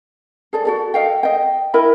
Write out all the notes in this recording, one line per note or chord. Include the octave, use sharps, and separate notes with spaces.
G#4 A4 D5
F#4 A4 D5
A4 D#5 F5 G5
D#5 G5
E4 A#4 D#5 B5